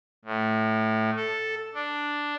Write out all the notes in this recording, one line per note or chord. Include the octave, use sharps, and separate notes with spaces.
A2
A4
D4